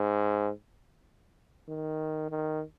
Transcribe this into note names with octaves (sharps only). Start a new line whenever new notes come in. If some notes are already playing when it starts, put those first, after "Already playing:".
Already playing: G#2
D#3
D#3